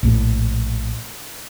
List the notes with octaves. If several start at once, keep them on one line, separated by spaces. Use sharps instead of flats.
A#1 A2